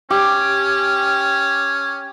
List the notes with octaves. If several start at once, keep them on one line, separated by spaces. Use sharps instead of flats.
C#4 G4